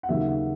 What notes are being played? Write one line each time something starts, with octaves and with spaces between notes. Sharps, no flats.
F#5
D#2 C#3 F#3 A#3 E5
F#5